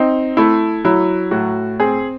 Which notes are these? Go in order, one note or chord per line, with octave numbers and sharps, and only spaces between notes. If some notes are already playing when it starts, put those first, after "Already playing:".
Already playing: C4 D#4
A3 E4
F#3 E4
A2 F#4
C4 G#4